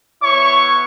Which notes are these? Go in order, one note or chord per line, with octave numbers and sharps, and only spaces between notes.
B3 E4 C#5 C#6